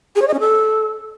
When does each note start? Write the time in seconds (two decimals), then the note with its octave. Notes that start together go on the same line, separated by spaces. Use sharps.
0.16 G#4
0.22 C#5
0.28 D#5
0.34 C#4
0.40 A4